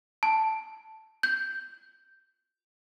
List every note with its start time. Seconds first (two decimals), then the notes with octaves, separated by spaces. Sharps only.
0.23 A5
1.23 G6